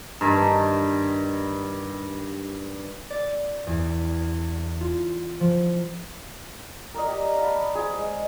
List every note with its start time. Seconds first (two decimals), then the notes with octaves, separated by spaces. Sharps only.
0.21 G2 D#3
3.10 D5
3.67 E2
4.81 F4
5.40 F3
6.94 A#4 D5 D#5
7.08 G4
7.38 F5 A5 B5
7.75 G#4 C5
7.94 G#3